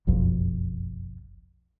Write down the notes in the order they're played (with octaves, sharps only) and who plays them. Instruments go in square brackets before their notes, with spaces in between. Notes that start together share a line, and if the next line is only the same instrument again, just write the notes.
[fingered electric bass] F#1 B1 F2